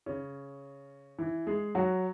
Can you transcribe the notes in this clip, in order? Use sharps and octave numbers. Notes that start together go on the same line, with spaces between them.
C#3 C#4
E3 E4
G#3 G#4
F#3 F#4